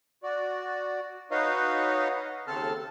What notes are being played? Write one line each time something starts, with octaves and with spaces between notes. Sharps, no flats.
F#4 D5
D#4 F#4 B4 C#5 D#5 F5
D#2 C#3 C4 A4 A5 F6